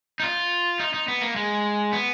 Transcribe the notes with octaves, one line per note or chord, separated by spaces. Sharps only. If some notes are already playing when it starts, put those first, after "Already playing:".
D#4
F4
D#4
D#4
B3
A#3
G#3
B3